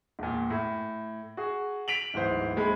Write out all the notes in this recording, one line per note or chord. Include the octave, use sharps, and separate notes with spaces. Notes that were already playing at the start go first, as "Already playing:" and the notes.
E1 A#2
A2
F#4 G#4
B6 D7 F7 F#7
D1 G#2 E3 C5
D2 G#3 B5